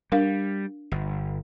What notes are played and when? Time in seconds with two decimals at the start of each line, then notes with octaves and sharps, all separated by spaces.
0.12 G3 D4 A#4 F5
0.92 G1